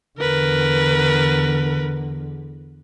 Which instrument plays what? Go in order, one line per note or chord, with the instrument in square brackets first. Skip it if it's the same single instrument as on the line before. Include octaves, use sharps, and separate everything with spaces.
[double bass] E2 D3 [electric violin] A#4 B4